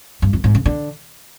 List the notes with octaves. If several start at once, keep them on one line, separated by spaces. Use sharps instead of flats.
G2
F2
G#2
C#3
D3